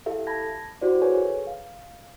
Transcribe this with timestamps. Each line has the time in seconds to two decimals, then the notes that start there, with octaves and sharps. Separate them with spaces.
0.06 E4 G4 A4 E5 F5
0.27 A5 B5 G#6 A#6
0.81 E4 F#4 G4 C5 D5
1.02 G#4 A4 B4 C#5 G#5
1.47 F5